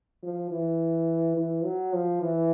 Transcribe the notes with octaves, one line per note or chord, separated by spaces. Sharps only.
F3
E3
E3
F#3
F3
E3